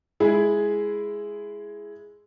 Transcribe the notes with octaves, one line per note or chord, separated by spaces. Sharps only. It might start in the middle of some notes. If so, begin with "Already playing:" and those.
G#3 E4 G#4